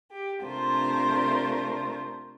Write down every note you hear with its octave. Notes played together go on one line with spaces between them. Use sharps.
G4
C3 A3 D4 F4 A#4 C5